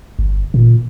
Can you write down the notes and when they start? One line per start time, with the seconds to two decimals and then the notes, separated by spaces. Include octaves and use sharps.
0.19 G1
0.54 A#2